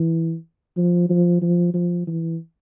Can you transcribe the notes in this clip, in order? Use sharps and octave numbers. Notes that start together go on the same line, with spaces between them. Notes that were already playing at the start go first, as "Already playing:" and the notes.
Already playing: E3
F3
F3
F3
F3
E3